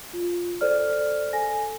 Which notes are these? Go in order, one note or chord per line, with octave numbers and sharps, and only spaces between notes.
F4
A4 C5 D5 F6
A4 G#5 A#6